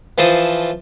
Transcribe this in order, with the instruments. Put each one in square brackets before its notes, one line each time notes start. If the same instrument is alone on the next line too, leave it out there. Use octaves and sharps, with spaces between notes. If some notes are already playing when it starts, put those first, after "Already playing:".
[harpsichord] E3 F3 C5 A5 D#6